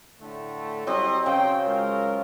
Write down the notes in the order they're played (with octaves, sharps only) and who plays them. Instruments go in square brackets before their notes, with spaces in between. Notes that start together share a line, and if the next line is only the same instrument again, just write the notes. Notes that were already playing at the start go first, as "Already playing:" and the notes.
[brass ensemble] A2 D3 A3
[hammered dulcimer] F#3 C4 [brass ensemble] G3 E4 D#5
[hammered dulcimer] C#3 C5 [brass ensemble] G5
[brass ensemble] G#3 F4 A#4